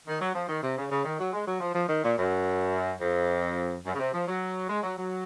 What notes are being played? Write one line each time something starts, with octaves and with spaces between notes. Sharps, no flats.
D#3
F#3
F3
D#3
C3
C#3
C#3
D#3
F#3
G#3
F#3
F3
F3
D#3
A#2
F#2
F2
F#2
C#3
C3
F3
F#3
G#3
F#3
F#3